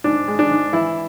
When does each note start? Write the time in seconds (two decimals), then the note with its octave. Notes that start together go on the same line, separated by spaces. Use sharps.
0.04 G#2 D4
0.28 G#3
0.39 D4
0.51 G#2
0.72 E3 E4